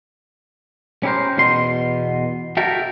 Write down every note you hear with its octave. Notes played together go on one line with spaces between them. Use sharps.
C#4 E4 G4 A4 A#4 C5
E2 B2 C6
F#4 G4 A4 A#4 E5 G5